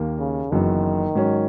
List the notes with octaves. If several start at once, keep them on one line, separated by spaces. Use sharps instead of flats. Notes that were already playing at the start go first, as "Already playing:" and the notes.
Already playing: D#2 D#3 A#3
C#3
F#1 F#2 D#3 E3 B3
G#2 F#3 C#4